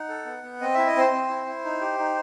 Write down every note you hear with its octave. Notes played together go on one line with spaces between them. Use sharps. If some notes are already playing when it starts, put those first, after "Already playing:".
Already playing: D#4 F#5
A4
B3
B3
C4 D#5
E4 E5
D#5
C4 C5
C4
E4
E4
D#4
G4
D#4